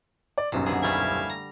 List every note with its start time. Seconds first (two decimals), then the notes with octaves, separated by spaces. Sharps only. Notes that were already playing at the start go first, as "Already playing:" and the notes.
0.38 D5
0.52 D#1 B1 F#2 C3
0.66 B2 D3 G#4
0.83 G3 A3 E4 F5 G#5
1.29 A#5